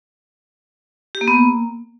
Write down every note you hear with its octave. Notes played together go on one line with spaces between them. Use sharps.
G4
A#3
B3
A#3